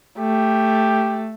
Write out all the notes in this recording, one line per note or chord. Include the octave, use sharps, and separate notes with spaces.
A3 G4